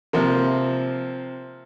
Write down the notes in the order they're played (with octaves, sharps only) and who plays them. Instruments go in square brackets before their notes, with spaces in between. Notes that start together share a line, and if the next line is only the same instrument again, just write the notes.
[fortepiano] C3 F3 A#3